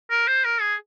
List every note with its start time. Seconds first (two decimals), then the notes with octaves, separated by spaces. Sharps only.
0.10 A#4
0.27 C5
0.44 A#4
0.61 G#4